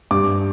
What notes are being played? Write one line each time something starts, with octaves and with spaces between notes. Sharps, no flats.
G2 D6